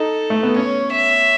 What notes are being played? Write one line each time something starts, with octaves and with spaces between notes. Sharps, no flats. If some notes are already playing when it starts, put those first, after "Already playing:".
Already playing: D#4 A4
A3
B3
C#4 C#5
E5